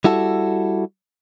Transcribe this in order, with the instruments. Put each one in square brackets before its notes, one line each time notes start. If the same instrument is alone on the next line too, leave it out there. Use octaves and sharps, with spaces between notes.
[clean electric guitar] G3 E4 F#4 A4